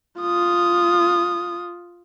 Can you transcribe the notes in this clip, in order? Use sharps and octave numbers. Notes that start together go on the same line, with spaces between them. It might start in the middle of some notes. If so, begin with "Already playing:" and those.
F4 D#6